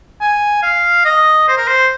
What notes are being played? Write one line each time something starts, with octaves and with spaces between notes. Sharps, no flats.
G#5
F5
D#5
C5
A#4
C5